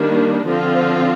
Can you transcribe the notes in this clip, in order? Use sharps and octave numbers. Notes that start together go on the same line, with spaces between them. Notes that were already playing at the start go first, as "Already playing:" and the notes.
Already playing: D#3 G3 A#3 D4
D3 F3 C4 F4